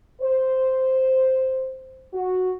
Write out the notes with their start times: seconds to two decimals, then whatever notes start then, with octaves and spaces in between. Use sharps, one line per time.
0.21 C5
2.14 F#4